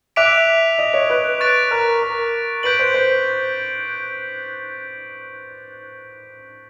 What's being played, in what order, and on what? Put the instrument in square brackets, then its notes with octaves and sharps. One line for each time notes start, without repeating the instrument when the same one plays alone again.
[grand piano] E5 [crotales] D6 F#6 B6 D7 F7
[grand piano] D#5
C#5
B4
[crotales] C#6 F#6 A6 D7
[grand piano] A#4
A#4
[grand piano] B4 [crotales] G6 B6 D7 F#7
[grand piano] C5
C5